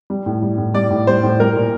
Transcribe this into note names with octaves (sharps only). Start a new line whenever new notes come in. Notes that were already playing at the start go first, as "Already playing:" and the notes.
G3
A2
G3
A2
G3 D5
A2
G3 C5
A2
G3 A#4
A#2